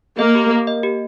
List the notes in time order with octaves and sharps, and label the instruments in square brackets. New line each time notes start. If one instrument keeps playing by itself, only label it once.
[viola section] A#3 [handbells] D#5
[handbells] G4
A#4
D#5
G4